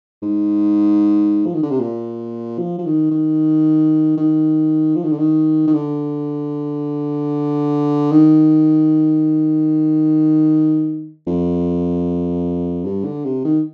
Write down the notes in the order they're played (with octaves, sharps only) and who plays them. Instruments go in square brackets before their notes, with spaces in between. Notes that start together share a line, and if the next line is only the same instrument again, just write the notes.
[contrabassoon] G#2
F3
D#3
D3
C3
A#2
F3
F3
D#3
D#3
D#3
F3
D#3
D3
D#3
D#3
D3
D#3
F2
G2
D3
C3
D#3